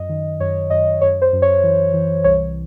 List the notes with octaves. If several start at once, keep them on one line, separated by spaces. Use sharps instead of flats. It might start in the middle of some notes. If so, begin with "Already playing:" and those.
Already playing: F#2 D#5
D#3
F#2 C#5
F#2 D#5
F#2 C#5
C5
F#2
C#5
E3
E3
C2 C#5